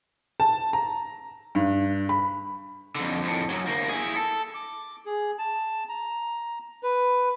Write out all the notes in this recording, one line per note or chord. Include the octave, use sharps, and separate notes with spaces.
A5
A#5
G2
B5
F2 D3
F2 A2
F#2 F#3
D2 A#3
E4 G#4
A4
D6
G#4
A5
A#5
B4